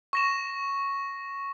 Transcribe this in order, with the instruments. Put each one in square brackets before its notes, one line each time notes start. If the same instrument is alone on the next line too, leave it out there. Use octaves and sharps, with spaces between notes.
[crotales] C#6 A#6 E7